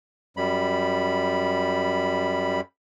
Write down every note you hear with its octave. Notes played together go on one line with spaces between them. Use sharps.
F#2 G3 B5